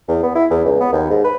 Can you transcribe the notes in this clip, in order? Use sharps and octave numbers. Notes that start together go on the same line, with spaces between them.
E2
B3
E4
E2
C#2
B3
D#2
G#2
B4